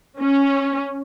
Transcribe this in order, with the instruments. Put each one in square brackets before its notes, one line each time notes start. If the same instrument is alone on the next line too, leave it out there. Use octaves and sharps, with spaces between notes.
[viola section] C#4